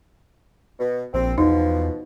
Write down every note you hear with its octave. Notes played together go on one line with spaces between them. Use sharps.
B2
A#1 C4
E2 B2 F3 D#4